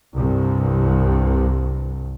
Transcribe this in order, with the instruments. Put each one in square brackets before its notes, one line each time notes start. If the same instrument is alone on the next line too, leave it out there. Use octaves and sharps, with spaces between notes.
[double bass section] C2 G2